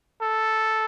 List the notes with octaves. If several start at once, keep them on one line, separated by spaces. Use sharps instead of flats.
A4